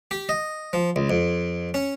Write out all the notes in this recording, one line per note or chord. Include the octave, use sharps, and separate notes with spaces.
G4
D#5
F3
C#2
F2
C#4